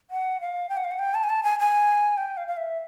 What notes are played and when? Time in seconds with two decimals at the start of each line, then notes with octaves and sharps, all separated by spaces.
0.11 F#5
0.41 F5
0.69 G5
0.77 F#5
0.84 F5
0.91 F#5
0.99 G5
1.14 A5
1.24 G#5
1.29 A5
1.43 G#5
1.59 G#5
2.17 G5
2.37 F5
2.48 F5
2.57 E5